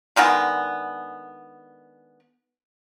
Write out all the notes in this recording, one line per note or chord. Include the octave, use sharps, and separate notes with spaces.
D3 D#3 G#3 B3